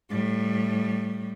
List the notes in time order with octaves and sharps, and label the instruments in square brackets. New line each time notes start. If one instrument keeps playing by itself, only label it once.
[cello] A2 G3